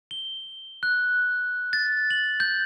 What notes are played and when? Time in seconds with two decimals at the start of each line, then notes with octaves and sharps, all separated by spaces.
0.11 G7
0.83 F#6
1.73 A6
2.11 F#7
2.40 G6